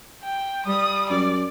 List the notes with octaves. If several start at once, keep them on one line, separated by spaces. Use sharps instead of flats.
G5
G3 D#6
F#2 D5